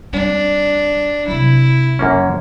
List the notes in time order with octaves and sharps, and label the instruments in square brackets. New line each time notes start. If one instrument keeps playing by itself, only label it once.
[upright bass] G3 C4 [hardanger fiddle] D4
[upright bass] C3 F#3 [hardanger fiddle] E4
[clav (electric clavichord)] F#2 A#3 C#4 [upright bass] C#3